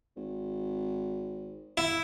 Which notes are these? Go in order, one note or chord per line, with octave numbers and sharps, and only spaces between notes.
G#1
E4